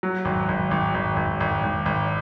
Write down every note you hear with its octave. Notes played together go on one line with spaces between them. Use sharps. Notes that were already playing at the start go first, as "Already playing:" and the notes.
F#3
G#1
G#1
G#1
G#1
G#1
G#1
G#1
G#1